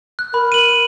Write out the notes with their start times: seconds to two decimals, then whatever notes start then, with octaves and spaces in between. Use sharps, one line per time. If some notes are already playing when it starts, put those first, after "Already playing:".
0.19 F#6
0.34 A#4 B5
0.52 D#7 F#7